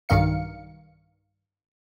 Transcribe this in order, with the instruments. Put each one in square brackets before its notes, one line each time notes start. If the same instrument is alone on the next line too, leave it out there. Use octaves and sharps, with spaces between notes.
[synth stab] B1 G2 D#3 F5 C#7